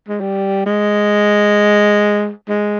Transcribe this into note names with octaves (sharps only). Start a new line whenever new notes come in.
G#3
G3
G#3
G#3